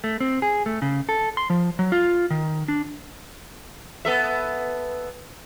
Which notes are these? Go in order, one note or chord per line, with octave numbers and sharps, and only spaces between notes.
A3
C4
G#4
A3
C#3
A4
C6
F3
F#3
F4
D#3
D4
B3 A4 E5